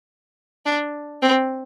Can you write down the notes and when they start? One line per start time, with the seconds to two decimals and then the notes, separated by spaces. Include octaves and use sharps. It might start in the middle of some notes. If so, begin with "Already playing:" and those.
0.65 D4
1.22 C4